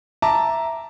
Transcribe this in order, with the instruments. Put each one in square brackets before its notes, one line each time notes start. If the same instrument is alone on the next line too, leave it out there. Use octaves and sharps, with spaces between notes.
[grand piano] E5 A5 A#5 D6